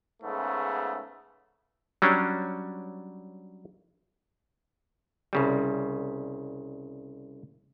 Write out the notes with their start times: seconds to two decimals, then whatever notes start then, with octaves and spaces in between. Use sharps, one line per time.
0.22 G#2 C#3 A3 B3
2.02 F#3 G3 C#4 D4
5.33 C2 C#3 G3